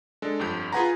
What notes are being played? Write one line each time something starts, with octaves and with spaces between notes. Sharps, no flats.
G#3 D4 A4
G1 F2 G4 G6
F4 G#4 B4 F#5 G#5 A#5